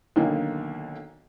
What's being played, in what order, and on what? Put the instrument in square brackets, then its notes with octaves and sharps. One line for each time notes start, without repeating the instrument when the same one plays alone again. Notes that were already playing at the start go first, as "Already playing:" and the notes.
[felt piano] B1 D3 D#3 A#3